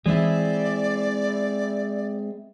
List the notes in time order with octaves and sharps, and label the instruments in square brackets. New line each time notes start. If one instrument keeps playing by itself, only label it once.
[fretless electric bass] E3 [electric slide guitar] G#3 C4 E4 [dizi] D5